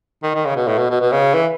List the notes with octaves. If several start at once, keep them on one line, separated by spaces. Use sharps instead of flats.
D#3
D#3
C#3
B2
A2
B2
B2
B2
C#3
E3